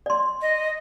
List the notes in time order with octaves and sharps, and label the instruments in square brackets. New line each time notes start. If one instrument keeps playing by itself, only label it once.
[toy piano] D5 C6
[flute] D#5